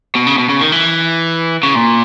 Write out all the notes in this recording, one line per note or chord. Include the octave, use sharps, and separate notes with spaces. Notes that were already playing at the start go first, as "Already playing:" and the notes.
B2
C#3
B2
C#3
D#3
E3
C#3
A#2